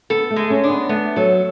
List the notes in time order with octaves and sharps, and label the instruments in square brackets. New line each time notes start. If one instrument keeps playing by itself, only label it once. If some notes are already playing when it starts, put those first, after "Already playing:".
[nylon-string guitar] B3 [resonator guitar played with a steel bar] A4
[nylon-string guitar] A3
[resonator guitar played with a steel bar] G#3
[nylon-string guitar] C#4
[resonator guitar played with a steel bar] D4
[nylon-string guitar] B3
[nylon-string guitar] A3 [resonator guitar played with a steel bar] B3
[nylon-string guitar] F#3 [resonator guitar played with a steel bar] A4